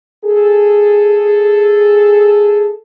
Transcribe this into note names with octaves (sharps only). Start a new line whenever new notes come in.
G#4 A4